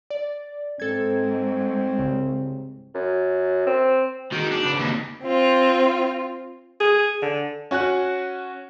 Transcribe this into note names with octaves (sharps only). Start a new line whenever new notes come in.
D5
G#2 C4 A4 G#6
C2 C#3
F#2
C4
D#3 F#4 G#4
D4
C#3 C4 B4
D#2
C4 F4
G#4
D3
C#4 F#4 G#5 F#6